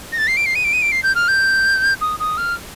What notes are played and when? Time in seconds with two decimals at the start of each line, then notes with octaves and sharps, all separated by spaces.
0.12 A#6
0.18 A6
0.28 C7
0.37 D7
0.46 C7
0.55 D#7
0.64 D7
0.73 D#7
0.82 D7
0.92 C7
1.03 G6
1.15 F6
1.28 G6
2.01 D#6
2.20 D#6
2.38 F6